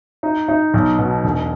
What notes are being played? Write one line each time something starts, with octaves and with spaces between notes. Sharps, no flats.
D#4
D#4
B1
B2
E1